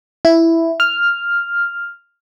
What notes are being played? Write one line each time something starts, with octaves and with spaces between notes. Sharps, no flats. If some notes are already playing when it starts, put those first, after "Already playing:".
E4
F6